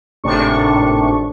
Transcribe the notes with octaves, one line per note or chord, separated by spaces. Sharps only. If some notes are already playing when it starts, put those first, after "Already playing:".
G#1 A2 C3 D4 C#6